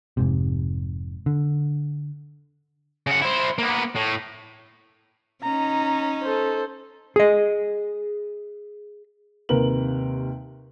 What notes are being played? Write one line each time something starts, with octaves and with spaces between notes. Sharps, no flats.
F1 G#2 C3
D3
C#3 F#5
E4 C5
A#3 B3
A2
C#4 D#4 A#5
A4 C5
G#4 D#5
D#2 C3 A#4 B4 F#7